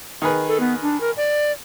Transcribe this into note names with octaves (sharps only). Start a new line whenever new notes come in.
D#3 G#4 B4
A4
B3
D4
A#4
D5